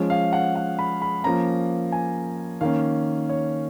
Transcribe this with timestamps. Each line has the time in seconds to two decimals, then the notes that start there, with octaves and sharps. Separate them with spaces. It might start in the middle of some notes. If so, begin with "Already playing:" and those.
Already playing: F3 G#3 C#4
0.10 F5
0.33 F#5
0.56 F#5
0.79 B5
1.02 B5
1.24 F3 A#3 C#4 A#5
1.92 G#5
2.61 D#3 A#3 C#4 F5
3.29 C#5